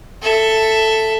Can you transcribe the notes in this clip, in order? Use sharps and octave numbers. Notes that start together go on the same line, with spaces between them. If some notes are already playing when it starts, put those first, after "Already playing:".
A4 E5